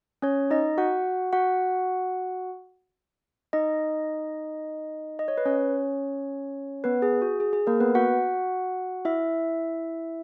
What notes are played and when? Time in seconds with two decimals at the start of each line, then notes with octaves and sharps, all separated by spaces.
0.22 C#4 C#5
0.51 D#4 D#5
0.78 F#4 F#5
1.33 F#4 F#5
3.53 D#4 D#5
5.19 D#5
5.28 C#5
5.38 B4
5.45 C#4 C#5
6.84 B3 B4
7.02 G#4
7.22 F#4
7.40 G#4
7.53 G#4
7.67 A#3 A#4
7.80 B3 B4
7.95 F#4 F#5
9.05 E4 E5